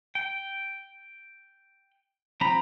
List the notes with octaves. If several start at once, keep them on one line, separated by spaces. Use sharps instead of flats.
G5
F3 C4 A#5 B5